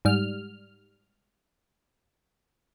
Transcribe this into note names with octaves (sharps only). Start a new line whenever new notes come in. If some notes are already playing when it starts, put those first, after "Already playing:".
G#2 G3 F6